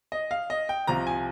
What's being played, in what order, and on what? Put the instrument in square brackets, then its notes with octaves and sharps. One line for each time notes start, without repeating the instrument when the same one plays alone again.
[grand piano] D#5
F5
D#5
G5
C2 C3 F3 A#5
G#5